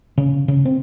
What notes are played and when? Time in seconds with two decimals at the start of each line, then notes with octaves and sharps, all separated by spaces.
0.18 C#3
0.48 C#3
0.65 C4